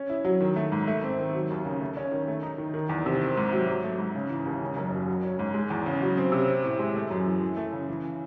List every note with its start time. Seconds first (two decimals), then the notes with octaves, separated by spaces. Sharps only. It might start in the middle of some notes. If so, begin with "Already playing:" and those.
Already playing: C#4
0.10 E4
0.25 F#3
0.40 D#3
0.56 A3
0.72 G#2
0.87 A3
1.04 C4
1.18 D#3
1.34 F#3
1.50 D#2
1.65 C#3
1.81 A3
1.97 C#4
2.12 D#3
2.28 A3
2.43 D#4
2.58 D#3
2.74 D#3
2.89 E2
3.06 C3
3.21 C4
3.37 G#2
3.52 F#3
3.67 F#3
3.84 A3
3.98 G#2
4.15 C#3
4.30 E3
4.45 D#2
4.61 C#3
4.76 F#1
4.92 F#2
5.08 F#3
5.24 C#4
5.39 G#2
5.54 G#3
5.70 E2
5.86 C#3
6.02 F#3
6.17 C4
6.32 C3
6.48 C4
6.64 A2
6.79 G#3
6.95 A3
7.10 F#2
7.26 E3
7.41 E3
7.57 A3
7.72 C#3
7.88 E3